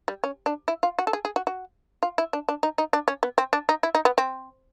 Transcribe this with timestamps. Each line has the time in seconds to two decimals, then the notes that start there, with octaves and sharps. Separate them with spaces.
0.08 G3
0.24 C#4
0.46 D4
0.68 E4
0.83 F4
0.99 F#4
1.07 A4
1.13 G#4
1.25 G#4
1.36 F#4
1.47 F#4
2.03 F4
2.18 E4
2.33 D4
2.49 D4
2.63 D#4
2.78 D#4
2.93 D4
3.08 C#4
3.23 B3
3.38 C4
3.53 D4
3.69 D#4
3.83 E4
3.95 D#4
4.05 B3
4.18 C4